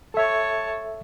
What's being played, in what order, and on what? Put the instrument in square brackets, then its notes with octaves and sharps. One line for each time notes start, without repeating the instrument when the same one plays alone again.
[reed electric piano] A4 E5 [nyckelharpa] C#5 A5